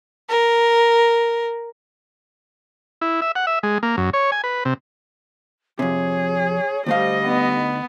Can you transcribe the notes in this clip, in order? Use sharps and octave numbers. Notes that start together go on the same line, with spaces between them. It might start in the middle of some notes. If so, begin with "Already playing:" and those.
A#4
E4
E5
F#5
E5
G#3
A#3
F#2
C#5
G#5
B4
C3
F2 C3 G#4 C#5
D2 G3 A3 C5 D#5 F5
B3 D#4